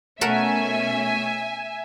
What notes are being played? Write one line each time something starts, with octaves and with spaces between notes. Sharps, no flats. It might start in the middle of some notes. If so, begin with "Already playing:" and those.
B2 A3 C#4 A4 A#4 E5 F#5 G#5